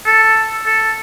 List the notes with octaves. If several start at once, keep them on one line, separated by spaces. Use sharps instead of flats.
A4
A4